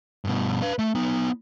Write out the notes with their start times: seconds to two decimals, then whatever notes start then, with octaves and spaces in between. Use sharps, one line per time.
0.25 G2 B2
0.62 B4 F5
0.79 A3
0.95 B3 D#4